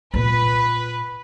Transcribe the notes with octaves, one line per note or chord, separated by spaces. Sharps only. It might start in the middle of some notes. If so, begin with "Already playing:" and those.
A#2 F4 B4